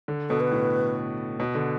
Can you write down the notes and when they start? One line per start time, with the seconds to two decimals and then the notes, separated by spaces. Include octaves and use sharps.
0.08 D3
0.29 B2 A4
0.40 B4
0.51 A2
1.40 B2
1.55 D3